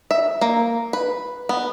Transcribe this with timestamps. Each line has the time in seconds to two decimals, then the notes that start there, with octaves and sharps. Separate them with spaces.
0.11 E5
0.41 A#3
0.93 B4
1.49 B3